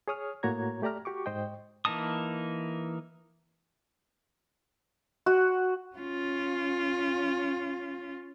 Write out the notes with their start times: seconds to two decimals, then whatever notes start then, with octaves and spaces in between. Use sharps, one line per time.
0.08 G#4 C#5 D#6 F6
0.43 A2 A#3 F#4 C#5 A#5 G#6
0.82 A3 G4 D5 A#5 F6
1.05 F#4 G4 C#6 D6
1.26 G#2 C5 D#5 G5
1.85 E3 A#3 D#4 A5 D#6
5.26 F#4
5.96 C#4 F4